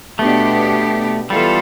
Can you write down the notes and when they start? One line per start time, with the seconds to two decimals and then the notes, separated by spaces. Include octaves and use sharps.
0.19 B2 A3 B3 D4 G4
1.30 E3 G3 B3 F4 A4